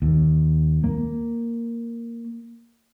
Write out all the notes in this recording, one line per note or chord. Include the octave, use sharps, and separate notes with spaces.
D#2
A#3